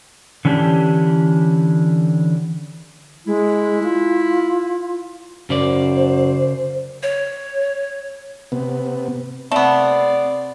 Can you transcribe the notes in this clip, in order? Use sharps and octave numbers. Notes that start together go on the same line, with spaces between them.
D3 E3 C#4 D4 F#4 G4
G#3 E4
F4
F#2 C#3 C5 D5
C#5
C3 B3
C3 A3 B3 C4 D5